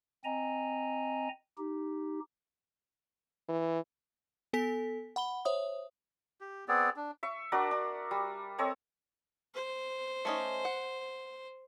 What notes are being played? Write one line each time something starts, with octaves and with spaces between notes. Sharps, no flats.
C4 D#5 G#5 A#5
D#4 G4
E3
B3 A4 G#5 B6
F#5 B5 G7
C5 C#5 E5 D#6
G4
B3 C4 G#4 D5
D4
E5 C#6
D4 F#4 A#4 D5
D4
G3
C4 A4 C#5 D#5
C5
A3 C#4 D#4
F#5